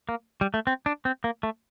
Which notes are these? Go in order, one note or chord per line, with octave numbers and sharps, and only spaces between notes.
A#3
G3
A3
C4
D4
C4
A#3
A3